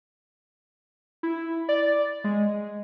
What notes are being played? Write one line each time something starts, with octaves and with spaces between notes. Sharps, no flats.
E4
D5
G#3